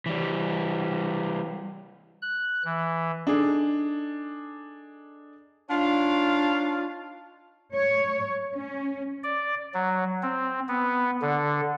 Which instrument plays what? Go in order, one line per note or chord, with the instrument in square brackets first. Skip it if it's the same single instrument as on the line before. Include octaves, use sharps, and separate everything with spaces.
[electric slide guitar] E3 G3
[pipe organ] F#6
E3
[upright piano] D4 D#4 G#4 A4
[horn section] D4 D#4 F4 C#5 F5
[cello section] C#5
C#4
[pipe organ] D5
F#3
C4
B3
D3